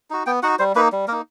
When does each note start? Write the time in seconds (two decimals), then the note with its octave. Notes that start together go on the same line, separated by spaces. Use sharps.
0.10 D#4 F#4
0.26 B3 G5
0.43 D#4 F#4 F#5
0.59 G3 C5
0.75 A#3 D#4 B4
0.92 G3
1.08 A#3 A#4
1.12 D#4